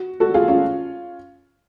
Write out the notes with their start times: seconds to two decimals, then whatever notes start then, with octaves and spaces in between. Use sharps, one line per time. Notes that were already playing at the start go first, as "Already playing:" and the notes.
Already playing: F#4
0.20 F#4 A4
0.34 F4 G#4
0.48 C#4 F4